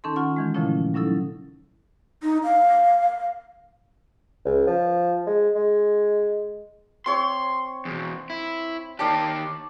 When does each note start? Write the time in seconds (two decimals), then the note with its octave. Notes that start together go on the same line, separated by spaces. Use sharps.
0.04 D#3 C#4 D#4 A4 A5 C6
0.16 F4 F#5 C#6
0.36 D#3 E3 G#3
0.54 A#2 C#3 F3 A3 C#4 E4
0.94 F#3 C#4 D#4 E4 A4
2.23 D#4
2.44 F5
4.45 C#2
4.67 F3
5.27 G#3
5.56 G#3
7.06 C4 C#5 C6 C#6
7.85 E2 B2
8.30 E4
8.99 D#3 G4 C#5 D5 A5